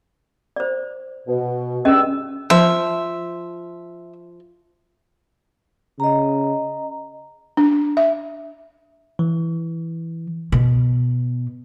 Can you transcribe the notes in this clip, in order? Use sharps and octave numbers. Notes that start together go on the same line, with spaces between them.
C5 D5
B2
G2 G#3 C#4 D#5 E6
F3 E5
C#3 D#5 A#5
D4
E5
E3
B2